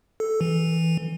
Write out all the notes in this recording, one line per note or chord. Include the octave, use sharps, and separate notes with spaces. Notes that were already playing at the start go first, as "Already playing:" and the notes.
A4
E3